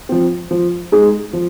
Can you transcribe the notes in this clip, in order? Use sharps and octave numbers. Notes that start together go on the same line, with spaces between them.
F3 C4
F3
G#3 D#4 G#4
F3